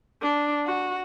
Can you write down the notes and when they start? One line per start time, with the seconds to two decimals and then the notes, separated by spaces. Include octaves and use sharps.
0.22 D4
0.66 F#4